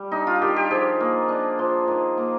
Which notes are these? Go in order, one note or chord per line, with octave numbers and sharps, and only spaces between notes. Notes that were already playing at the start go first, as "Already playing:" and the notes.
Already playing: G3
D4 D#4
F4
D#3 G4
G4
F3 G#4
A#3
D4
F3
D#3
A#3